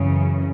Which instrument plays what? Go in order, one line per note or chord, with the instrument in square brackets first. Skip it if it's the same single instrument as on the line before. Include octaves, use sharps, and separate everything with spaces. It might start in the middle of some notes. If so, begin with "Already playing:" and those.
Already playing: [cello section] F#2 C#3 E3